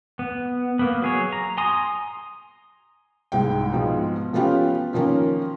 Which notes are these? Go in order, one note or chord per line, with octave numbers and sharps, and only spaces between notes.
B3
A#3 B3
F#3 G#4 C#5
A#5
G#5 A#5 C6 D#6
C2 G#2 G5
G#2 B2 F3
F3 A3 B3 C#4 F4 G4
D#3 F3 A#3 C#4